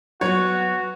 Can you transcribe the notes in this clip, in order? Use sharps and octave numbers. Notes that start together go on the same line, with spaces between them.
F#3 B3 F#4 C#5